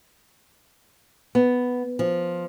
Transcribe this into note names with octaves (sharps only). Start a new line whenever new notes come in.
B3
F3